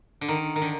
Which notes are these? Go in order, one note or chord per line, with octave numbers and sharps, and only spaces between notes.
D3
D#3
D#3
D3